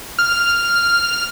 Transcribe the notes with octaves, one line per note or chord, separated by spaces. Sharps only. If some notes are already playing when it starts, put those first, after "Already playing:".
F6